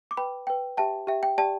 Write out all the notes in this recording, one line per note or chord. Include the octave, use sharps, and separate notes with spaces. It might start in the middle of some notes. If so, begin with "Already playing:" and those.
D6
B4 G5 B5
B4 G5
G4 E5 G5 A5
G4 E5 G5
G5
G4 D5 G5 A5